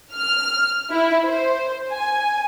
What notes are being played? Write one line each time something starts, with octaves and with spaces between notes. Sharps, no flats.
F6
E4
C5
G#5